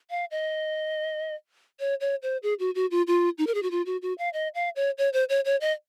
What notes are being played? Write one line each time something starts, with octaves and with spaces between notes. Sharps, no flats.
F5
D#5
C#5
C#5
C5
G#4
F#4
F#4
F4
F4
D#4
A#4
G#4
F#4
F4
F#4
F#4
F5
D#5
F5
C#5
C#5
C5
C#5
C#5
D#5